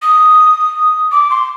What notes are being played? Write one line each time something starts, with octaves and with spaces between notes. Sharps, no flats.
D#6
D6
C6